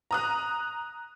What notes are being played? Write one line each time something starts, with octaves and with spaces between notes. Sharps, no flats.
A#5 D#6 F#6